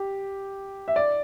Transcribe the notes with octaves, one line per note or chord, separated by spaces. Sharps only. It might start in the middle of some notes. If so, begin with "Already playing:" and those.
Already playing: G4
E5
D5